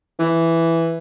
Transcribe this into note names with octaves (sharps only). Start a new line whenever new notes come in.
E3